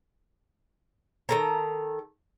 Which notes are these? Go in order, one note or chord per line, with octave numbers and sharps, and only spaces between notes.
D#3 A4 A#5